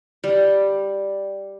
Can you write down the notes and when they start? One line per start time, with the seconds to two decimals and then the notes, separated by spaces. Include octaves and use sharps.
0.24 G3